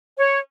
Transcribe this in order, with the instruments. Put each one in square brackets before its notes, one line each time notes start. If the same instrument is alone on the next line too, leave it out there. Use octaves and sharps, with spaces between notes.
[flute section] C#5